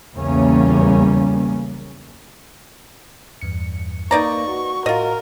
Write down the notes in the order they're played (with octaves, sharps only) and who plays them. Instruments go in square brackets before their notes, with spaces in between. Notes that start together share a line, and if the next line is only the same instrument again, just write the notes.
[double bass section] B1 E2 C#3 G3 A#3 C#4
[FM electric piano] E2 G2 C#7
[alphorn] A#3 [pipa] D#4 D5 A#5 [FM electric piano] B4 [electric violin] C#6
[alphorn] F#4
[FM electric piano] A2 [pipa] F4 D#5 [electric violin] A#4